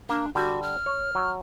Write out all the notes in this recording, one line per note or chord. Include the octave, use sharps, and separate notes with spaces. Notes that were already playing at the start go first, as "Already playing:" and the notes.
A#3 D4
D3 G3 F#4
F6
C#5
F#3